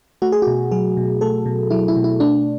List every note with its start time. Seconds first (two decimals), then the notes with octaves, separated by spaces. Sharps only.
0.22 A3 F#4
0.32 G#4
0.42 B2 F#4
0.71 F#3 G#4
0.97 B2
1.21 A3 A4
1.46 B2
1.70 F#3 E4
1.88 E4
1.96 B2
2.04 E4
2.20 A3 D4